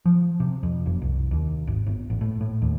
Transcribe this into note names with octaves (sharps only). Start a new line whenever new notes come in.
F3
C3
F2
F#1
C2
D#2
G#1
G1
A1
A2
A2
D#2